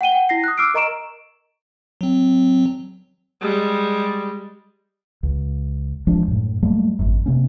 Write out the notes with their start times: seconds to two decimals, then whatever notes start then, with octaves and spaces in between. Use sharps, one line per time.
0.01 F#5 G5 D#7 G7
0.12 F#5 G5
0.29 E4 A#6 C7
0.44 D#6 F#6
0.58 D6 E6 F6 C7 D7
0.74 A#4 D#5 A#5 C#6 D7 E7
2.01 F#3 C4
3.41 G3 G#3
5.23 C#2
6.07 C#2 F3 G#3 D4
6.28 F#2 A2
6.62 F#3 G3 A3 A#3
6.99 G#1 F#2
7.26 C3 A#3 C#4